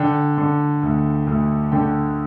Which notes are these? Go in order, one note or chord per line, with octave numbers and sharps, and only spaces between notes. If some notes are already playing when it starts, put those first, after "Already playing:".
Already playing: D3 G5
D3
D2
D2
D3 G5